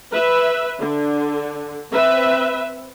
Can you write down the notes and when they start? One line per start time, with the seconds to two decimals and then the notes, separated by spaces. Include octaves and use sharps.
0.13 B4 E5
0.79 D3
1.91 C4 B4 E5